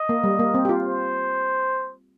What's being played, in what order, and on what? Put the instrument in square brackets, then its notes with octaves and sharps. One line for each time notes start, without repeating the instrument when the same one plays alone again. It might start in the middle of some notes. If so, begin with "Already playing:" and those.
Already playing: [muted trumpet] D#5
[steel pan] A#3
G3
A#3
C4
G4
F4
[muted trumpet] C5